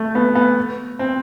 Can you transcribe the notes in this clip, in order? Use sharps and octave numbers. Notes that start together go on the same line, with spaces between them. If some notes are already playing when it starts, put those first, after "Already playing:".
Already playing: A3
B3
B3
C4